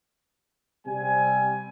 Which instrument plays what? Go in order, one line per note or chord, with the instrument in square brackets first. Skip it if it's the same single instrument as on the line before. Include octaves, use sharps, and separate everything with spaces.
[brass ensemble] C3 G3 C4 G#5